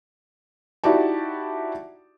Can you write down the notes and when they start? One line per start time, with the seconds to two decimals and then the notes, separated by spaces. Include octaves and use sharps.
0.84 D#4 E4 F#4 G4 D5 A5